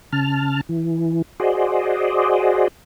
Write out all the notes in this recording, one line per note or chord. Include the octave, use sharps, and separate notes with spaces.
C#3 A5 F6
E3
F#4 G#4 C5 D5 D#5